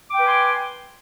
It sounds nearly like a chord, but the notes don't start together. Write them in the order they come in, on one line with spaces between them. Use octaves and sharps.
D6 G5 B4 G#5 C6